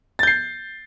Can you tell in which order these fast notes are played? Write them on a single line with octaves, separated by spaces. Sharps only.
A6 G6 C7